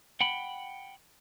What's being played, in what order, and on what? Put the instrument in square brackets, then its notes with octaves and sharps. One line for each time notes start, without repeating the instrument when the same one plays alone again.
[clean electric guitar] F#5 G5 B5